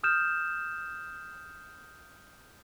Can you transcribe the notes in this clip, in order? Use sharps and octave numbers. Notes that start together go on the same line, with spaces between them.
D#6 F6 G6 E7